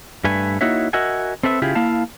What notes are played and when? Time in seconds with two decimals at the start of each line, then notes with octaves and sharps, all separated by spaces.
0.24 G2 A3 B4 G#5
0.61 A#3 D#4 E4 F#4 C#5 E5
0.93 F#4 A#4 D#5 E5 F#5 G#5
1.43 C4 A4 B4 E5
1.62 C#3 E4 F4 G4 G#4
1.75 A#3 E4 F5 A5